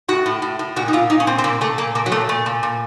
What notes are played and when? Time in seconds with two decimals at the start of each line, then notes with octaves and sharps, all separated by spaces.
0.08 A2 F#4
0.26 A2
0.42 A2
0.59 A2
0.76 A#2 F#4
0.88 D#4
0.93 A#2 F4
1.10 A#2 D#4
1.20 C#4
1.27 A#2 C4
1.38 C4
1.44 A#2 A#3
1.61 A#2 A3
1.78 A#2 A#3
1.95 A#2 A#3
2.06 F#3
2.12 A#2 A3
2.29 A#2 A3
2.46 A#2
2.63 A#2